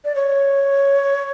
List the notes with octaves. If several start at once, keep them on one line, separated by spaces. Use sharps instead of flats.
D5
C#5